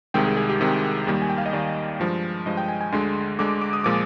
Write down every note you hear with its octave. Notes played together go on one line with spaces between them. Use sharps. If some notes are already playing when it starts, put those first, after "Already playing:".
C2 C3 D#3 G#3 G5
G#4
G#4
G4
C2 C3 D#3 G#3 G4
D#2 D#3 G3 A#3
G#5
G5
F5
D#5
D#2 D#3 G3 A#3 D5
G2 F3 G#3
G2 F3 G#3 D#5
G5
G#5
G#5
D2 D3 G#3 C6
D2 D3 G#3 D6
D6
D#6
A#2 F3 G#3 D6